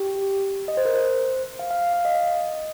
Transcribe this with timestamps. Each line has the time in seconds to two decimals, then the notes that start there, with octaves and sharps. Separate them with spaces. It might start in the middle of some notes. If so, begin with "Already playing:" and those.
Already playing: G4
0.68 D#5
0.77 C5
0.85 A#4
0.95 C5
1.59 F5
1.71 F5
1.82 F5
1.93 F5
2.05 D#5